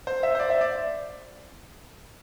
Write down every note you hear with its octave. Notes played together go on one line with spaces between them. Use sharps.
C5
E5
C5
D5
E5
D5